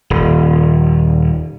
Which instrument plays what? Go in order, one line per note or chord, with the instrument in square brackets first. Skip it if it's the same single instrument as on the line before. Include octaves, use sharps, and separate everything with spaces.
[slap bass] D#1